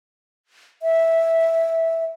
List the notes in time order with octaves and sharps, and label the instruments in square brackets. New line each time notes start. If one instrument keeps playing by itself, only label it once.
[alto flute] E5